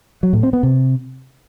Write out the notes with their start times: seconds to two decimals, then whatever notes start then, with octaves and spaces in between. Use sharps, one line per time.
0.23 F#3
0.33 A2
0.43 C4
0.53 B3
0.63 C3